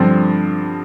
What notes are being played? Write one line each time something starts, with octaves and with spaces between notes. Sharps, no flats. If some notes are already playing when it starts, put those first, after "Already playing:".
Already playing: G2 D3 F3 C4